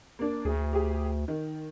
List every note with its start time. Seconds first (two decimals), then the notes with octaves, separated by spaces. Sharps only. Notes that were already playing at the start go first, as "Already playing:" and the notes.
0.19 A#3 D4
0.45 D2 G#4
0.73 G4 G#4
1.28 D#3